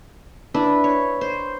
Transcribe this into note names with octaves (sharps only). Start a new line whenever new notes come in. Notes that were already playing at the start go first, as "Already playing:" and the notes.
D4 E4 B4
C#5
C5